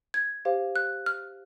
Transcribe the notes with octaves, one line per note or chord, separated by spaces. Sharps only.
G#6
G4 C5 F5
F#6
F6